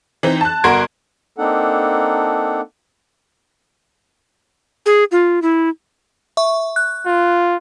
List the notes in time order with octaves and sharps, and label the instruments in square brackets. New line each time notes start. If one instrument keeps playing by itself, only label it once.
[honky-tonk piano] E3 C4 D#4
A5 F#6
G1 F#4 A#4 C6 G#6 D7
[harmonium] A#3 C4 D4 D#4 A4 F#5
[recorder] G#4
F4
E4
[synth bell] E5 C#6
F#6
[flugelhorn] F4